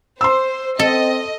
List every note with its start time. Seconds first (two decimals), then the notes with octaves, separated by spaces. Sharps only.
0.21 C5 C6 E6
0.79 C4 A4 D#5